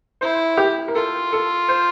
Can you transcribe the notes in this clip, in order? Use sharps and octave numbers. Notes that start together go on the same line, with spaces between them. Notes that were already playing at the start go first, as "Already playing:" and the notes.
E4 C5
G4
A#4
F4 A4
A4
C5